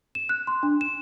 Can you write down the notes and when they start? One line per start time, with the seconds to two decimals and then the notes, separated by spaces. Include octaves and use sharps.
0.15 E7
0.29 F#6
0.47 C6
0.63 D4
0.81 E7